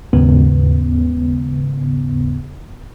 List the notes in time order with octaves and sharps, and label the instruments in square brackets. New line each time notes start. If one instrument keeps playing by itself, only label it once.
[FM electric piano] D#2 G#2 C#3 B3